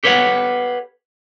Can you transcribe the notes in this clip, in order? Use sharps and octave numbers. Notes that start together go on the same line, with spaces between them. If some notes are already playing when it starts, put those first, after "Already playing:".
G4 A4 B4 C#5 F5 F#5